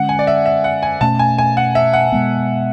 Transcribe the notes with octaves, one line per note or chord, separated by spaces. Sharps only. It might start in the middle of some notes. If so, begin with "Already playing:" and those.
Already playing: D3 G#3 C#4 F#5
G#5
D5
E5
E5
F#5
G#5
B2 A3 C#4 A5
G#5
G#5
F#5
E5
F#5
B2 G#3 B3